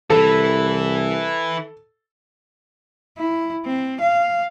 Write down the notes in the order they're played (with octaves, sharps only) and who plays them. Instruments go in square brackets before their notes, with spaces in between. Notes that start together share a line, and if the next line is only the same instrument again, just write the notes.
[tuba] C2 [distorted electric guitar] E3 [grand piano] A4
[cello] E4
C4
F5